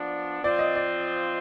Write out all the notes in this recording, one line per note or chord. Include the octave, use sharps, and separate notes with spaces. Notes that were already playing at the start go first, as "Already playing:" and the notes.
Already playing: F3 B3 D4 D5
F3 C4 F4 C5 D5
D#5
D5